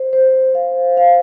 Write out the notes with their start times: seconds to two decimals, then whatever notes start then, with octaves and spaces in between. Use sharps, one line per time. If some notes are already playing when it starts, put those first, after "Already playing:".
Already playing: C5
0.13 C5
0.55 F5
0.97 F5